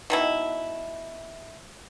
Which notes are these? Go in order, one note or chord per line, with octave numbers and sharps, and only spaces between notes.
B2 D#3 E4